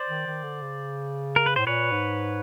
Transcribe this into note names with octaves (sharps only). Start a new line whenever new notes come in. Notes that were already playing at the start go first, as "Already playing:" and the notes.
Already playing: C5 D5
D#3
D#3
D3
C#3
A#4
B4
A2 C5
A#2 B4 C#5
G#2